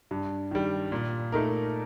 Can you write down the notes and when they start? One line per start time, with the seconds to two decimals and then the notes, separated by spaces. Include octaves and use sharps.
0.11 G2
0.51 D#3 G3
0.92 A#2
1.32 A3 D#4 A#4